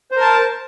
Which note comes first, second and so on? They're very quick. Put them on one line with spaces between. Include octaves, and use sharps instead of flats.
C5 A#4 A5